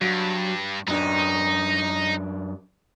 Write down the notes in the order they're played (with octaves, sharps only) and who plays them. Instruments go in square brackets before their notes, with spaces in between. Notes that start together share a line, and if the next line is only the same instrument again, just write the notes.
[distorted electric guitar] G2 [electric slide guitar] F#3
[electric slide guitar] F#2 D4 [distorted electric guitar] D#4